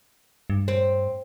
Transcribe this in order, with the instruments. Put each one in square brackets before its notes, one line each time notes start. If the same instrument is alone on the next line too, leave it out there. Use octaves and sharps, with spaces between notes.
[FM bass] G2
[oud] C4